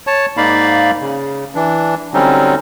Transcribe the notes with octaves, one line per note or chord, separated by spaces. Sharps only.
C#5 A5
G#2 A#3 D#4 D5 F5 B5
C#3
E3 D4
D3 F#3 G3 C4 C#4 D#4